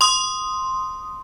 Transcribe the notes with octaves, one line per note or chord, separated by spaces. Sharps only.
C6 D#6